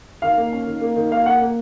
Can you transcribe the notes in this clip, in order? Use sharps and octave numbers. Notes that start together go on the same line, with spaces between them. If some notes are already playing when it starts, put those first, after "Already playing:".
D#3 F5
A#3
C#4
D#3
A#3
D#3
A#3 F5
A#3 F#5
A#3